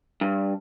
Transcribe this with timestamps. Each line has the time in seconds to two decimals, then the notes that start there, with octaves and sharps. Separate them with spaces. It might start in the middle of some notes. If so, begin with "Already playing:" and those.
0.21 G2